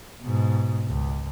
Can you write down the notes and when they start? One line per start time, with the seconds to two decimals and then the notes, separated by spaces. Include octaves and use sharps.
0.22 G#2 B2
0.88 C#2